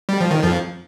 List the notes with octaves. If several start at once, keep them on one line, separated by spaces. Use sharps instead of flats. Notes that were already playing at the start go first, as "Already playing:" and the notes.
G3
F3
D#3
F2 F3